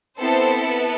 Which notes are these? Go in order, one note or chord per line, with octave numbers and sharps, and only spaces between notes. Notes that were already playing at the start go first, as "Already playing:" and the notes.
B3 C4 E4 A4 C5
B3 B4